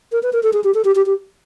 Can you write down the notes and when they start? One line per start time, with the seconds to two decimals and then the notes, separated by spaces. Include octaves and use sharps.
0.12 A#4
0.23 B4
0.33 A#4
0.43 A4
0.53 G#4
0.64 G4
0.74 A4
0.85 G4
0.95 G4
1.06 G4